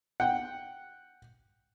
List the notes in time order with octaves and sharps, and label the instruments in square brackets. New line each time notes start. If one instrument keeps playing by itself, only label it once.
[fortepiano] F#5 G5